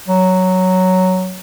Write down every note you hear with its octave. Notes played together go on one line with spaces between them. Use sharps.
F#3